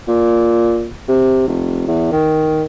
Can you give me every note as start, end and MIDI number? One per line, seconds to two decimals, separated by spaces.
0.08 0.87 46
1.08 1.47 48
1.47 1.84 29
1.88 2.11 40
2.12 2.63 51